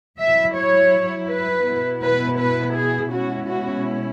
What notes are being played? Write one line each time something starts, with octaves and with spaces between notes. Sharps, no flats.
F#3 E4 E5
C#5
B4
B2 B3 E4
B4
B4
G#4
B2 G#3 C#4 E4 F#4
F#4